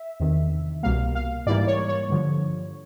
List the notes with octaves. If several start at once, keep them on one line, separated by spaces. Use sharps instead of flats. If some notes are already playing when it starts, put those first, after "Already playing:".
Already playing: E5
E2 C3 D#3
C2 B2 G3 A#3 F5
F5
G#2 E3 G3 A#3 D5
C#5
C#5
G2 D3 F3